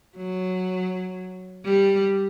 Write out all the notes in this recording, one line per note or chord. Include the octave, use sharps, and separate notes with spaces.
F#3
G3